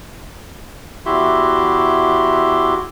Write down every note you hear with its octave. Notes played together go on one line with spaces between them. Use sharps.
E2 E4 F#4 G4 E5 C6